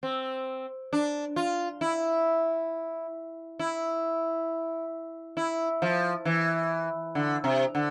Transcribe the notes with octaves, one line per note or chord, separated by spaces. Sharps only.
C4
D4
F4
E4
E4
E4
F3
E3
D3
C3
D3